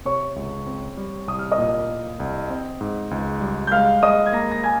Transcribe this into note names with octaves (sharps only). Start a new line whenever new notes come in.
C3 C#5 C#6
C#2
C4
G3
C2 D#6
F6
D#5 D#6
A#2
A#3
C2
C4
G#2
C#2
G3
G6
G#3 F5 F6
G#3 D#5 D#6
G#6
A#3 A#5 A#6
A#6
G#5 G#6